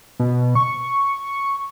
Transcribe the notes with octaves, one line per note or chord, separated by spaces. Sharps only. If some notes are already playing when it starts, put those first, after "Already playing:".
B2
C#6